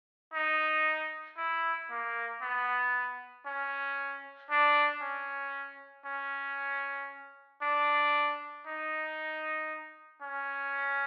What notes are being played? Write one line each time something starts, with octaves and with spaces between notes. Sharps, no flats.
D#4
E4
A#3
B3
C#4
D4
C#4
C#4
D4
D#4
C#4